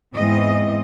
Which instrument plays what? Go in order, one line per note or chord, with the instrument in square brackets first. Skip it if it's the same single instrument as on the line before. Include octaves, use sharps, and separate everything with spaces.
[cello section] E2 G#2 E3 G#3 C4 D#5